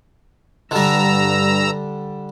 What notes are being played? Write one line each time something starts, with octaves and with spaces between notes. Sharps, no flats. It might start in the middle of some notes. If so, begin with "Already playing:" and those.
G2 D3 G3 A#5 E6